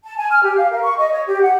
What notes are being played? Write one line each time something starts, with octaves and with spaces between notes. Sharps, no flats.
A5
G#5
F6
G4
F5
A#4
C#6
D#5
C#5
G4
F#5